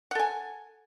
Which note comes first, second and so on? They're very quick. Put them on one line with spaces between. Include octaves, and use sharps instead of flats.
F#5 A4 G#5